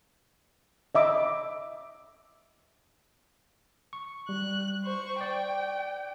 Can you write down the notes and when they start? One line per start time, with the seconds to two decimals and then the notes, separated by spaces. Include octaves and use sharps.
0.95 D#5 E5 D6
3.93 C#6
4.29 G3 F#6
4.84 C5 C#6
5.21 D5 G5